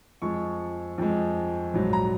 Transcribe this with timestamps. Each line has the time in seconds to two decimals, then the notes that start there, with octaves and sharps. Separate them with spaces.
0.22 F2 F3 G#3 C#6
0.98 F2 F3 G#3
1.74 A#1 G#2 F#3
1.93 A#5